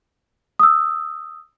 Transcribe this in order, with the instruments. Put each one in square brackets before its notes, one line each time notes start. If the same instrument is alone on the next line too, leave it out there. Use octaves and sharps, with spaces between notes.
[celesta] D#6 E6